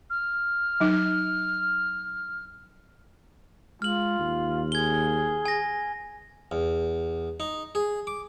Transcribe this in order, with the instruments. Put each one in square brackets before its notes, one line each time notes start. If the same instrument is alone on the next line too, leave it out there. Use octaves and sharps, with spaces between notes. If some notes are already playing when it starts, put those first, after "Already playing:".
[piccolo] F6
[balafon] F#3 D#4
[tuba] G#3 [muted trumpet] F4 [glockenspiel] F6 F#7
[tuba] D#2
[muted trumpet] G#4 [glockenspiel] G#6 G7
[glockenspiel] G#5 A#6
[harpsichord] E2
D#4
G#4
D6